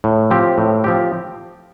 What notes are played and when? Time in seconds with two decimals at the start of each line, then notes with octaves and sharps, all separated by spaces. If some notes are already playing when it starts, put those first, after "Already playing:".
0.04 A2
0.31 F3 C4 G4
0.58 A2
0.84 F3 C4 G4